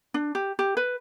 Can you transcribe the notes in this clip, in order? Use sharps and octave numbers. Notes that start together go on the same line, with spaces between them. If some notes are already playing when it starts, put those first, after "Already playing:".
D4
G4
G4
B4